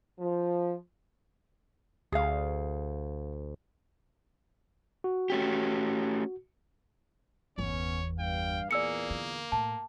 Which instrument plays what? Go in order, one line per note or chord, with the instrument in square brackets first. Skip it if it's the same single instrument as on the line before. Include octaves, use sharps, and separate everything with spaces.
[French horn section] F3
[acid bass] D2 [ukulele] G#4 F5
[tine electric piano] F#4
[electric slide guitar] A3 C#4 G4
[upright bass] G1 E2 [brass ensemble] B3 C#4 [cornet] C#5
[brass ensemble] G2 F5 [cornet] G5
[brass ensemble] E2 A#2 G#4 [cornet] A#3 [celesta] D5 E6 C#7
[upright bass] D3
[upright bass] A2 [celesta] A5